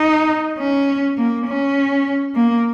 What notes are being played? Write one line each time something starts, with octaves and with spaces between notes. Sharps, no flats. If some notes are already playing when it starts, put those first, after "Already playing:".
Already playing: D#4
C#4
A#3
C#4
A#3